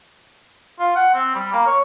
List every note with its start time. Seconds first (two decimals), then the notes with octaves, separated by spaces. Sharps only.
0.80 F4
0.96 F#5
1.14 C4
1.35 G3
1.53 A#3
1.67 C#5